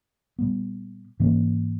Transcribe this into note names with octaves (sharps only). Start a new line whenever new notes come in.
A#2 G3 B3
G#2 E3 A#3 C#4